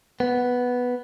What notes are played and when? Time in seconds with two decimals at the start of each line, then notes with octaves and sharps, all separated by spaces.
0.20 B3